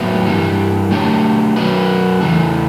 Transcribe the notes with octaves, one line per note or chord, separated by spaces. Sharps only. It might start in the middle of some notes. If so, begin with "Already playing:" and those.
Already playing: A2 F#3 B3 E4
G2 E3 G3
F#3 A3 D4 G4 C#5
F#3 C#4 F#4 B4
E2 C#3 E3 A3